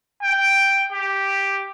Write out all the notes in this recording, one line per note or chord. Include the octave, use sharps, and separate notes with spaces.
G5
G4